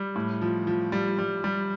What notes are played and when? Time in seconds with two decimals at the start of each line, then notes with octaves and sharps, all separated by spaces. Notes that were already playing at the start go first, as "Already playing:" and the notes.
Already playing: G3
0.16 A2
0.41 F3
0.67 F3
0.92 G3
1.18 G3
1.44 G3